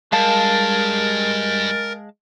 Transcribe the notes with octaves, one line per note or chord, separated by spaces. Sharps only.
G2 G#3 A#4 F5 A5 A6